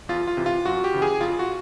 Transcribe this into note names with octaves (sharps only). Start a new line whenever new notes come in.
E2 F4
F4
C3 E3
F4
F#2 F#4
G4
C#3 E3
G#4
F2 F4
F#4